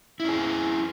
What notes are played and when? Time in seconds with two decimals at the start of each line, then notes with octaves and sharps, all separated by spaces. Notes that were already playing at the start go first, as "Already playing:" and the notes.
0.20 E4
0.24 C#4
0.29 G#4